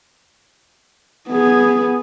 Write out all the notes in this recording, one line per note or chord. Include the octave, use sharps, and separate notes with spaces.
B3 G#4